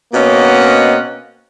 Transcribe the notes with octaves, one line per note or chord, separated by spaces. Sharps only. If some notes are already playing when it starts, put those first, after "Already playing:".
B2 A#3 C4 C#4 D#5 F#5